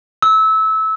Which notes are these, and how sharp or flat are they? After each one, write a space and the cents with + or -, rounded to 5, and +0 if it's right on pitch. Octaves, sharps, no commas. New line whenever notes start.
E6 -25